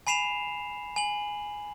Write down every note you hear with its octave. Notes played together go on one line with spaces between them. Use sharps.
G#5 B5 C7 E7 F7
G#5 F#7